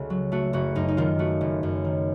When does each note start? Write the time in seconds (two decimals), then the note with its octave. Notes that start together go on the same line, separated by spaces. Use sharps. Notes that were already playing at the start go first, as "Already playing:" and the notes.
Already playing: C#2 C#3 A3 F#4 A4
0.10 F#3
0.32 A3 F#4
0.53 F#1 F#4
0.75 F#2 D#4
0.88 D#4
0.97 D#3 F4
1.19 A3 F#4
1.41 F#1
1.63 F#2
1.85 D#3